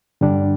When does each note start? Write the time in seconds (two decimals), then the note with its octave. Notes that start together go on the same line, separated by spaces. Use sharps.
0.21 G2 D3 G3 D4